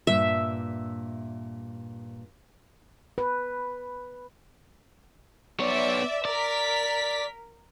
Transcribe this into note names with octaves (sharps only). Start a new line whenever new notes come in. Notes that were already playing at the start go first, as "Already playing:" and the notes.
G2 A#2 E5
B4
B3 C#5 D5 E5
A#4 D5 B6